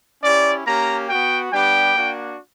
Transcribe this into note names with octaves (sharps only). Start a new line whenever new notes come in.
C#4 E4 G4 D5
A#3 C#4 G4 A#5
B3 F#4 G5
G3 B3 D4 G4 G5
A#3 D4 F#4